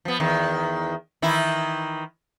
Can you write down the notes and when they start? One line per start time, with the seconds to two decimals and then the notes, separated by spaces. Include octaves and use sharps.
0.05 F3 B3
0.20 E2 D#3
1.22 D#3 E3 E4